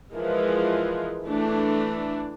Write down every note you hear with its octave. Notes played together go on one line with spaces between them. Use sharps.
E3 F3 G#3 A#4
E3 A3 D4